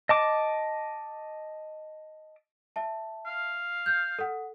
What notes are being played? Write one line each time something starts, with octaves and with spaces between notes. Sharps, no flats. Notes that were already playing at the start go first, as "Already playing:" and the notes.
D#5 A5 D6
E5 A5
F5
F6 G6
A4 F#5